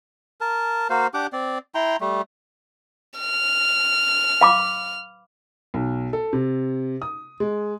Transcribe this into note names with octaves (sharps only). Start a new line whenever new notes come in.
A#4 A5
A#3 F#4 C5 F5
D4 G4 F#5 D6
C4 D5
E4 G5 A#5 C6
G3 A3
F6
F5 B5 D6
B1
A4
C3
D#6
G#3